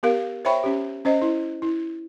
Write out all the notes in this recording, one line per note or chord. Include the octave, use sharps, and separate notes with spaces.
B3 G4 A#4 F5
C5 C#5 E5 G5 B5 C#6
C#4 G4
C#4 C5 D#5
E4
E4